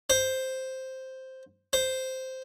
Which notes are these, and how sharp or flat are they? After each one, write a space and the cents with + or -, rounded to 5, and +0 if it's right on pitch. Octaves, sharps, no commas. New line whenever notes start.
C5 +0
C5 -5